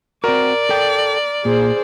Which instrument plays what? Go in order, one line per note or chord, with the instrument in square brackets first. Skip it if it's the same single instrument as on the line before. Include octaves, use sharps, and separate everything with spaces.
[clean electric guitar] C4 F#4 [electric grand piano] A#4 [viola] D5
[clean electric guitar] A4 G5
[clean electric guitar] A#2 [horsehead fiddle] G#4 C5